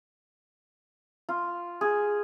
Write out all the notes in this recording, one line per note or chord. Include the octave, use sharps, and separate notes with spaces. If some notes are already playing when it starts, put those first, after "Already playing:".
F4
G#4